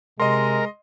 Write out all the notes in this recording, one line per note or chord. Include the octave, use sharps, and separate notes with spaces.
C3 G#3 A#4 D#5 C6